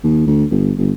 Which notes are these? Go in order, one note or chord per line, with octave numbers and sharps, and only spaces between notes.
D#2
D2
G1
G1